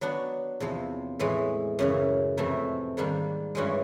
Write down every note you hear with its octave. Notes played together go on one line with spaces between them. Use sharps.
F#3 B3 D4 F#4
E2 C3 F3
A2 E3 G#3
F#2 C#3 E3
F2 C3 E3 A3
G#2 D#3 G3 A#3 D4
G2 E3 G#3 C#4 F#4